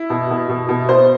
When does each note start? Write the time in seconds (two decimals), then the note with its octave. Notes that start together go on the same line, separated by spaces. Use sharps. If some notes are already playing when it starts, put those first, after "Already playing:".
Already playing: E4
0.10 B2
0.30 B2
0.49 B2
0.69 B2
0.89 B2 C5